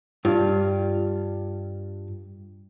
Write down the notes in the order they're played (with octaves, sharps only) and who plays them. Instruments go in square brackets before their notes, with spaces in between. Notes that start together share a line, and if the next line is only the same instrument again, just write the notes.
[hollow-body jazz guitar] G2 F4